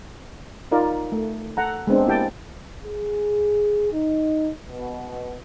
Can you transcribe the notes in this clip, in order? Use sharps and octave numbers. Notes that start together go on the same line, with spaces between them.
D#4 F4 A#4 D5
A3
A4 F#5 A#5
G#3 B3 C4 D4
A#3 E4 G4 G5 A5
G#4
D#4
B2